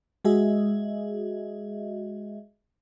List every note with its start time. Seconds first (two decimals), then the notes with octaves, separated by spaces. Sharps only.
0.25 G#3 F#4 G#4 D#5 E5